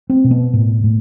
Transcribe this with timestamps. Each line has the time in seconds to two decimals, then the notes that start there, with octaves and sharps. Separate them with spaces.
0.10 C4
0.24 B2
0.31 B3
0.53 A2
0.84 A2